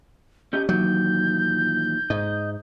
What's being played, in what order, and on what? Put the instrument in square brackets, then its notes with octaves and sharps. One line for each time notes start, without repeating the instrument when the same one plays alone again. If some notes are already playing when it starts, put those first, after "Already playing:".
[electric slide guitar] C#4 G4 D#5 [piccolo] G6
[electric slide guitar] A#2 D#3 E3 [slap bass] F#3 [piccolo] G6
[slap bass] G#2 [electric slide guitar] D#5